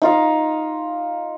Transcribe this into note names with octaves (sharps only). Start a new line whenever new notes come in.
D#4 F4 F5